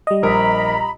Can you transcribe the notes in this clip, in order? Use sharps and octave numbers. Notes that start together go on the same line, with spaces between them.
G3 D#5
A#1 A#4 A#5 B5